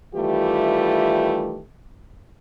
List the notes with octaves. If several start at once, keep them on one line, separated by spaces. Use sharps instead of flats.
D#3 E3 G3 A3 F4 G4